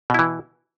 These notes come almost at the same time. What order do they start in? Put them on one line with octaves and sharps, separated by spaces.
B2 E4 E3